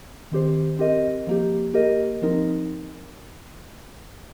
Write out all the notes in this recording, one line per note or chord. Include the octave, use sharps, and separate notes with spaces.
D#3 C4 G4 C5
C4 G4 A#4 D#5
F3 A#3 G4
A#3 G4 A#4 D#5
F3 C4 D#4 A#4